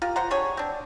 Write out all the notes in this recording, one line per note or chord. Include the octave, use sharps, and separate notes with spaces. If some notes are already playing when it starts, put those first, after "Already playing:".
F4 G4 A#4
C5 F#5 A#5
D4 G4 G#4 C#5
C4 D4